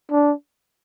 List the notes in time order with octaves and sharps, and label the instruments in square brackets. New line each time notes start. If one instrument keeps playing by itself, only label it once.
[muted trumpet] D4